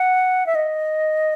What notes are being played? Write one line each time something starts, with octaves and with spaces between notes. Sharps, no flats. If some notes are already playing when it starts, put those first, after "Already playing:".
Already playing: F#5
E5
D#5